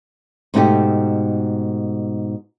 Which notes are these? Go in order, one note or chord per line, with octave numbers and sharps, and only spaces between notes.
G#2 B2 A3 D#4 F#4 G4